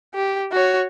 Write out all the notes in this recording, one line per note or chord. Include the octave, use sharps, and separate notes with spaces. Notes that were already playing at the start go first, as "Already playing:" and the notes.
G4
F#4 C#5